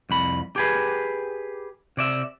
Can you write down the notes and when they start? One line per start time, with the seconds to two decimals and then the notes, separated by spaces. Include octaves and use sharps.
0.10 C2 F2 B5
0.56 G4 G#4 B4
1.97 C3 D5 E5